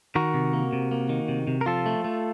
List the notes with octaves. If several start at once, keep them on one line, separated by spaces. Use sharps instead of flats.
D#3 F#4 A#4
C3
A#3
C3
A#3
D#3
C3
C3
A#4
F3 F4 A4
A3
A3